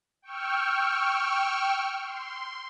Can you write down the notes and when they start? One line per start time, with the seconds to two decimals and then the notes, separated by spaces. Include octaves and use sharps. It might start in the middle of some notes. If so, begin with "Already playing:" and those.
0.22 G5 C#6 E6 F6
2.01 C6